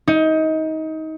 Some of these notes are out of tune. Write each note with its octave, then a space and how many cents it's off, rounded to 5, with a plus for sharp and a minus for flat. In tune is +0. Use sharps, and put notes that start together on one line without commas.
D#4 +25